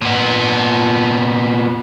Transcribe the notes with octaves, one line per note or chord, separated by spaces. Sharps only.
A#2 B3